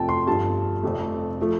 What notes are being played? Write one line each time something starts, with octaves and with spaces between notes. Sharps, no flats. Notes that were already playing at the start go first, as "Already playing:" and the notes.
Already playing: F1 F2 F3 A3 G5 A5
C6
G1 G2 F3 A3 A5
F1 F2 C3 A3
F3 A3